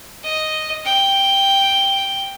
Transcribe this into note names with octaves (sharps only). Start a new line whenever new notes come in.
D#5
G5